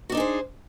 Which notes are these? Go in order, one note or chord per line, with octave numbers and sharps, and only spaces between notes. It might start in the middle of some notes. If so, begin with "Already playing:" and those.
D4 D#4 F#4 G#4 C5